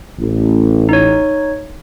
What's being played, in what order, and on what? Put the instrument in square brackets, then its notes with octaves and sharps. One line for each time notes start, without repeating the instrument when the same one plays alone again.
[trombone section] A1
[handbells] D#4 C#5